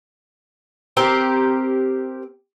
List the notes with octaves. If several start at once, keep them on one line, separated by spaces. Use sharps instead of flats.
C4 G4 A#4